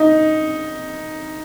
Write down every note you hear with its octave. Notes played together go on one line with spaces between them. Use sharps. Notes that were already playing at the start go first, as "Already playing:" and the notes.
Already playing: D#4